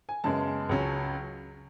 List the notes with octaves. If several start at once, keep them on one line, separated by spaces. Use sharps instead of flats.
G#5
F#2 C#3 G#3 B3 A5
C#2 C#3 F#3 C#4